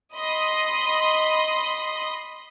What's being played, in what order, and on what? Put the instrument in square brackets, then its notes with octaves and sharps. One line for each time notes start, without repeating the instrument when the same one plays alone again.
[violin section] D#5 B5 C6 D#6